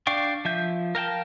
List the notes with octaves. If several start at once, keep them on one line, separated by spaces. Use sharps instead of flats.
D4 D5 F5 G5 C#6
F3 E5 G6
A#4 F5 G5 A5